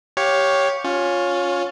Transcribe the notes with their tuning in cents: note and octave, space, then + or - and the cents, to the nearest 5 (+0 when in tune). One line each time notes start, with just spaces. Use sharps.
G4 +0 C#5 +0 F5 +25
C#4 +0 F4 +20